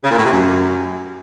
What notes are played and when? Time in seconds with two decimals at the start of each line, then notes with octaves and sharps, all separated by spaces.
0.04 C#3
0.11 A#2
0.18 A2
0.25 C3
0.32 F#2